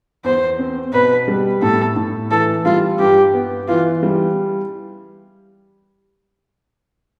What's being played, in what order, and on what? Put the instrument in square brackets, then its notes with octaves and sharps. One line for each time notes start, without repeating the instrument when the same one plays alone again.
[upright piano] E2 [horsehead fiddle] C5
[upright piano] C4
[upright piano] B2 [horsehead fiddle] B4
[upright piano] G3
[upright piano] A2 [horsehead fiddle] A4
[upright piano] A2
[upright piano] E3 [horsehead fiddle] A4
[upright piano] G3 [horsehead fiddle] F4
[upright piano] G2 [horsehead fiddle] G4
[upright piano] B3
[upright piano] E3 [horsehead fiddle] F4
[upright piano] G3